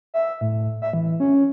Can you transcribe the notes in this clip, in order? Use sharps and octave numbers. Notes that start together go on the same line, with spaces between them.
E5
A2
E5
E3
C#4